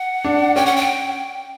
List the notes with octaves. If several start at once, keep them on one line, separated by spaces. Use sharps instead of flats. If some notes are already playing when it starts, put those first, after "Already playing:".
Already playing: F#5
D4
C#4 G5
F#5
G5